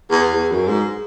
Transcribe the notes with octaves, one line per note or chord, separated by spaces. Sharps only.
E2
E2
F#2
G#2